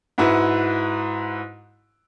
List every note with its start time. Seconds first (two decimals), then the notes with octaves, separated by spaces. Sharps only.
0.18 G#2 E4 F#4 B4